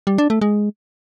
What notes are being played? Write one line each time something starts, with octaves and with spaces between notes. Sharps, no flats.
G3
D4
A3
G#3